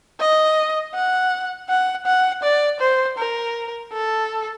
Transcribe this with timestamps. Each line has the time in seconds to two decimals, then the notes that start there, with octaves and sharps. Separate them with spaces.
0.20 D#5
0.94 F#5
1.69 F#5
2.06 F#5
2.43 D5
2.80 C5
3.18 A#4
3.93 A4